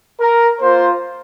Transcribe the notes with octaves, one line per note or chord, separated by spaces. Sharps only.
A#4
A#3 F4 C5